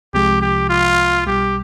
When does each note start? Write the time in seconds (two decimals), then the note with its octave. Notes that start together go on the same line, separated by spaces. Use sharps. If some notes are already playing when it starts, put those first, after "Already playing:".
0.14 C2 C3 F3 G#3 G4
0.41 G4
0.69 F4
1.26 B1 B2 G3 G4